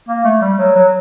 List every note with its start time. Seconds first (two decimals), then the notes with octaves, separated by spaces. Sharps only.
0.08 A#3
0.25 A3
0.42 G3
0.59 F#3
0.75 F#3